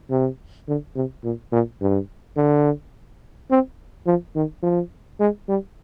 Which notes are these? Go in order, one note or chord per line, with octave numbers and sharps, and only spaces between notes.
C3
D3
C3
A#2
A#2
G2
D3
C4
F3
D#3
F3
G#3
G3